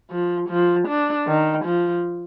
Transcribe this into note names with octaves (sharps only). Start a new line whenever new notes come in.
F3
F3
D4
D#3
F3